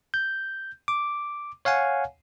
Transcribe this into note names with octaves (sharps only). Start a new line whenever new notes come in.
G6
D6
C#5 F5 F#5 G#5